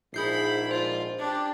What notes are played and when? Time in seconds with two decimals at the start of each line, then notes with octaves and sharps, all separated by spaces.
0.14 A#1 G#2 E4 G#4 B5 G6 C7
0.71 F4 C5
1.18 D4 G4